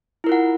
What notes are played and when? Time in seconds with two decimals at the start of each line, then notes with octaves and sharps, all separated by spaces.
0.24 E4
0.27 A#4
0.29 F4
0.32 F#5